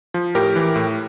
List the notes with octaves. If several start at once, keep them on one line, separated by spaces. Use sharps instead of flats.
F3
A2 G4 A#4
E3
A2